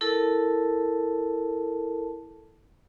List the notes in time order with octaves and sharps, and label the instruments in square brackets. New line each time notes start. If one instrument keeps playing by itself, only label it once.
[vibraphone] E4 A4 A#4 A5